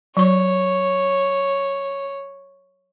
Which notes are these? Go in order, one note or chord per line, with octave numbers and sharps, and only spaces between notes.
F#3 C#5 C#6